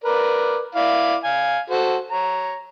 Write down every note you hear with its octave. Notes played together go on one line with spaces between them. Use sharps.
A#4 B4 D5
E4 D5 F5
F5 G#5
F#4 A4 C5
C#5 A#5